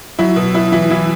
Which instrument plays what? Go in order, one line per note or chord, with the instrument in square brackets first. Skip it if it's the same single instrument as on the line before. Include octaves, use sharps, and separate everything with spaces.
[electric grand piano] F#3 [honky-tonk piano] E4
[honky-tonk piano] B2
E4
[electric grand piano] E3 [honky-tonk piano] E4
[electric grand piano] E3 [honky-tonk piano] E4